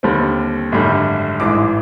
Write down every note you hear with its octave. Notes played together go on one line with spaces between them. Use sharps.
D#2 D3 G3 C4
G#1 F#2 D3 G3
A1 G#2 E3 D6